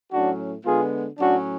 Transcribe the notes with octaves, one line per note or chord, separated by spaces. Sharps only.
A2 F#3 C#4 D4 F#4
D3 G#3 B3 F4 G#4
A2 F#3 C#4 D4 F#4